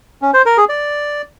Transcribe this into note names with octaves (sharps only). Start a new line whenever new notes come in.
C#4
C5
A#4
G#4
D5